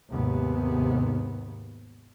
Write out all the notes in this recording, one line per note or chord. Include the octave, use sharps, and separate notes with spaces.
D#2 G#2 C3 B3